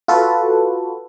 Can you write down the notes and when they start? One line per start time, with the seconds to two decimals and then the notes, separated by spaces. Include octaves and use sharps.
0.08 F4 F#4 A4 B4